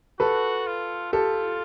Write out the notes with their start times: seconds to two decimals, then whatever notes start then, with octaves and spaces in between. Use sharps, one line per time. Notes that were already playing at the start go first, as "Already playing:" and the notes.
0.20 F#4 A4 B4
0.66 F4
1.13 F4 G4 A4